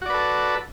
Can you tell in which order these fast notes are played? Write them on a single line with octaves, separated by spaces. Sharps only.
F#4 D5 B4 A4